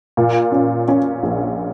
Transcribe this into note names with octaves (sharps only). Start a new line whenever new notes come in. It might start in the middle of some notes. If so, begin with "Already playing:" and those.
A#2
C#4
C#4
A#1